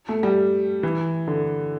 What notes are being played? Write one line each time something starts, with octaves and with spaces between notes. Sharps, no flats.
A3
G3
E3
D3